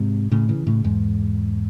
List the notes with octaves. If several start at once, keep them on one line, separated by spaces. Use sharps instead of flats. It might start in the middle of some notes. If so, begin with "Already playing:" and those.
Already playing: G#2 C3
A2 C#3
C#3 E3
A2 C#3
E2 G#2